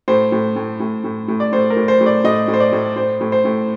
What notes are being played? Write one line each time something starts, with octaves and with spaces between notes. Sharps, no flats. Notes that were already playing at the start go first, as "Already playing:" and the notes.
A2 C5
A2
A2
A2
A2
A2
D5
A2 C5
A#4
A2
C5
A2
D5
A2 D#5
A2
C5
D5
A2
A2 C5
A2
C5
A2